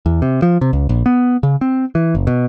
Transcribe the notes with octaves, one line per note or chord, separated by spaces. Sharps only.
E2
C3
F3
C3
C#2
A#1
B3
C#3
C4
E3
F#1
B2